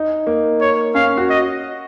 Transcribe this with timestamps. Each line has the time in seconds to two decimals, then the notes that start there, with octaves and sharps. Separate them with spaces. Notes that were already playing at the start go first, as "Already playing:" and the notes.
Already playing: D#4
0.27 A#3
0.61 C#5
0.95 C#4 F5
1.18 F#4
1.30 D#5